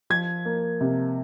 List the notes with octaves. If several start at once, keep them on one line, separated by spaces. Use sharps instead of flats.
F3 G#6
A#3
C3